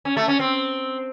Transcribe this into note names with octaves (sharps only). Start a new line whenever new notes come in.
C#4
A3
C#4
C4